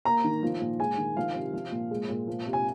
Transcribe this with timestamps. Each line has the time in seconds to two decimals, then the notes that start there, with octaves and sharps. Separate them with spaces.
0.05 A#3 A#5
0.24 D#3
0.43 F3
0.61 A#2
0.80 G#3 G#5
0.98 D#3
1.17 F3 F5
1.35 C3
1.53 F3
1.72 A#2
1.91 G#3
2.09 A#2
2.28 F3
2.46 C3
2.53 G#5